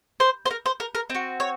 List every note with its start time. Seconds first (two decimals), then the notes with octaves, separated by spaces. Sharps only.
0.20 C5
0.46 C5
0.51 A#4
0.66 C5
0.80 A#4
0.95 A#4
1.10 C4 F#4
1.40 C#5